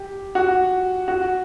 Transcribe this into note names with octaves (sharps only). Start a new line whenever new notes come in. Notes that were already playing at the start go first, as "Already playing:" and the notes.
Already playing: G4
F#4
F#4